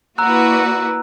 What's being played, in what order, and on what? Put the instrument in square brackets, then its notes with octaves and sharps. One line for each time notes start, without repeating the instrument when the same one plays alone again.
[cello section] A#3 E4 D5 [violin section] F#4 B4 [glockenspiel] A#5 E6 F#6